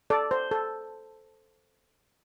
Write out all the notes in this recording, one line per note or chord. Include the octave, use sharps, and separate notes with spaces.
A4 D5
C5
A4